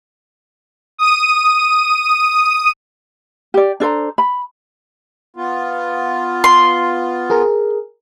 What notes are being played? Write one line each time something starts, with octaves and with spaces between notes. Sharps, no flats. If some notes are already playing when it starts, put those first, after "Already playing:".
D#6 D#7
G4 D5
D4 A4 C5 A#5
B5
B3 F4
C6
G#4 A#4